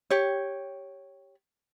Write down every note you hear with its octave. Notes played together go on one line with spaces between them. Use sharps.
G4 C#5